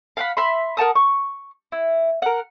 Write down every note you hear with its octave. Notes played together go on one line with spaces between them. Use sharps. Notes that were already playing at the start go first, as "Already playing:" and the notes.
F5 F#5 B5
E5 B5 C6
A#4 F#5 A5 D#6
C#6
E4
A#4 F#5